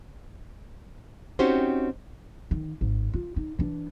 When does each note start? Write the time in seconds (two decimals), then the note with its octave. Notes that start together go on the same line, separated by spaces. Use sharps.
1.39 C4 C#4 D#4 F#4 G4 C5
2.51 D#3
2.81 G#1
3.13 F4
3.36 D#4
3.59 E3 D4